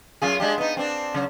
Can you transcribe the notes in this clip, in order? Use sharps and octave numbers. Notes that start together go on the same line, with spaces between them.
F#2 F4 G#4
G#3 D4 G4
B3 D#4
C4 D4
C#3 F#3